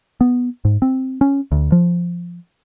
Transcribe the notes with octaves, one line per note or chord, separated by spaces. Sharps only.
B3
G#2
C4
C#4
D2
F3